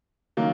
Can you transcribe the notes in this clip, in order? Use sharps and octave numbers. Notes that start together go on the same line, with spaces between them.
D#3 F#3 A#3